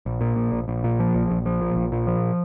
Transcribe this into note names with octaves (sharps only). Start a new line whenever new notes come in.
A#1
A#2
A#1
A#1
A#1
A#2
F3
A#1
A#1
F3
A#2
A#1
A#2
F3